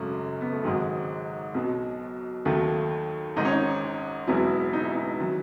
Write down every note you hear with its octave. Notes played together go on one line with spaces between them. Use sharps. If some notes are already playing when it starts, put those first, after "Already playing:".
Already playing: G#1 F#2 C#3 F#3 A3
B3
A3
G#1 G#2 D#3 F#3 G#3
B1 B2 F#3
D#2 D#3 F#3 A3
G#1 G#2 D#3 D#4
C#4
D#4
E1 E2 B2 F#3 E4
D#4
E4
D#4
D#3 F#3